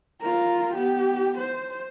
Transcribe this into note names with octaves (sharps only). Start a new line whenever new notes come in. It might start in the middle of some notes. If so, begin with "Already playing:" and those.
F4 A#4
B3 G4
C5